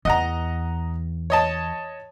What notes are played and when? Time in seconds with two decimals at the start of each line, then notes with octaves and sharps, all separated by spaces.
0.05 E2 D#5 F#5 A#5
1.30 C#5 D#5 A5